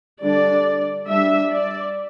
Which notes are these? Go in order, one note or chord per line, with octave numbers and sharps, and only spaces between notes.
D3 G3 D4 D5
G3 D4 E5
D5